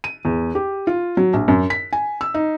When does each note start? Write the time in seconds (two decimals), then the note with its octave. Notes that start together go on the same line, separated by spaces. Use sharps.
0.04 D#7
0.25 E2
0.55 G4
0.87 F4
1.17 F#3
1.33 A#1
1.48 F#2
1.70 B6
1.93 G#5
2.21 E6
2.34 D#4